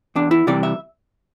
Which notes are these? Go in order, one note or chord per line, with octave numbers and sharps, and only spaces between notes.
E2 D4
E4
C3 E3 G3 D5
E5